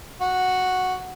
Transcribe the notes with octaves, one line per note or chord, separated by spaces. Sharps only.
F#4